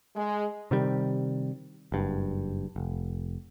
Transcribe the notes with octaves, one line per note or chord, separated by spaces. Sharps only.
G#3
C3 D#3 G3
F#1 G2
F1